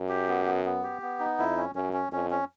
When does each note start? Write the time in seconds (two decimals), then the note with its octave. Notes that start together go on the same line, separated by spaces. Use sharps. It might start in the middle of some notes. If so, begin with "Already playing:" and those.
Already playing: F#2
0.09 G4
0.28 B3
0.46 B3
0.65 B3
0.84 G4
1.02 B3
1.20 D#4
1.38 F2 E4
1.57 C#4
1.75 F#2 C#4
1.93 C#4
2.12 F2 C#4
2.30 C#4